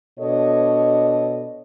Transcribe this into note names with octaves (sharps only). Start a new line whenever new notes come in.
B2 D4 A4 C#5 D#5